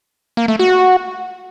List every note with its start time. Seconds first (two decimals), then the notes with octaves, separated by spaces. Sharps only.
0.37 A#3
0.48 A3
0.59 F#4